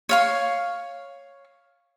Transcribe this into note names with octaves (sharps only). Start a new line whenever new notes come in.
C#5 F5 C#6